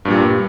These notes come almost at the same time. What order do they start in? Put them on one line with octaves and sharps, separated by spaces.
G2 A#2 G3